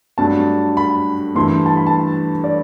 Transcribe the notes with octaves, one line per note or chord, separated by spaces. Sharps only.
G2 F#3 A3 D4 A5
B5
G2 E3 A3 E4 C6
A5
B5
A5
D5